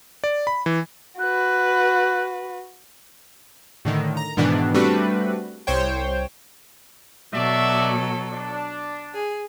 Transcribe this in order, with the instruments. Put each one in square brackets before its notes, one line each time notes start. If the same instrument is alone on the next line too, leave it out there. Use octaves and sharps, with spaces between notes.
[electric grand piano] D5
B5
E3
[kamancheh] F#4 B4 [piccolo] F#6
[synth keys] A2 D3 D#3
A#5
G#2 B2 D#3 E3 B3 D4
G3 A3 C4 D4 F#4 B4
C2 C5 C#5 G5
[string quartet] B2 F#3 A4 [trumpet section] F#4 D5 E5
[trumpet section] D4
[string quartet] G#4